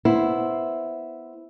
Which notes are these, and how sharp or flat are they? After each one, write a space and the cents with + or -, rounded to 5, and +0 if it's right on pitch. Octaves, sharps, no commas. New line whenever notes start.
B3 +0 E4 +0 C5 +0